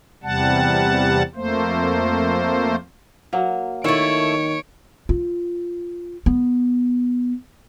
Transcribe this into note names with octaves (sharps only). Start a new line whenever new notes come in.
E2 C3 G3 F#5 A5
F2 A3 A#3 C5
F#3 A#3
D#3 A3 E4 C#5 D7
F4
B3